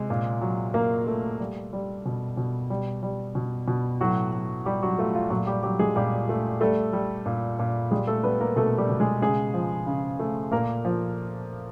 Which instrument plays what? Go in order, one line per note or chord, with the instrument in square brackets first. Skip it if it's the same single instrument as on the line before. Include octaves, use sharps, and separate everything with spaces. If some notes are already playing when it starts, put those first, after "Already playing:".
Already playing: [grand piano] C3 G#3
A#2
F#3
A#2 A#3 A#4
A3
G3
G3
B2
B2
G3
G3
B2
B2
A2 F#3 F#4
F#3
A2 G3 G4
F#3 F#4
A3 F4
F4
A#2 F#3 F#4
G3 G4
F#3 G3 G4
G#3 G#4
A#2 G3 G4
A3
G3 A3 A4
G3
A#2
A#2
G3 G#3 G#4
A3 A4
G3 B3 B4
A#3 A#4
B2 A3 A4
G3 G4
B2
G#3 G#4
C#3 G#3 G#4
F3
C#3
A3
A#2 A#3 A#4
F3